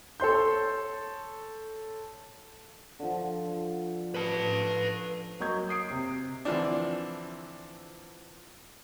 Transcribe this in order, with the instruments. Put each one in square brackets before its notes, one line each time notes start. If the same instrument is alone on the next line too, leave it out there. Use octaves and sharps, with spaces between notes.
[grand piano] A4 C#5 C6 G6
[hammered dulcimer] D3 F3
[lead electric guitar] B4 A5
[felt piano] F#3 A#3 D#5 C#6 G6 G#6
D#6 C7 D7
C3
[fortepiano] D3 E3 F3 C4 D4